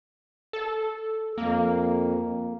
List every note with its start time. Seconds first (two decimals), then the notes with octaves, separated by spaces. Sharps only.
0.53 A4
1.38 F2 A#3